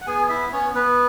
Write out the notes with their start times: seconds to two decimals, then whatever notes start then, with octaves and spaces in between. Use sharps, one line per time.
0.01 F#5
0.06 B3 G#4 G#5
0.29 E4 E5
0.52 B3 C#4 C#5
0.75 B3 B4